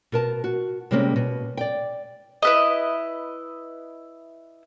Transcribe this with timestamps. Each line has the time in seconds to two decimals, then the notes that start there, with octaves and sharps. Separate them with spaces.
0.12 B2 A#4 A5
0.44 F#4
0.91 C3 G3 G#3 A#3 C#4
1.16 B2
1.57 D5 G5
2.43 E4 B4 D#5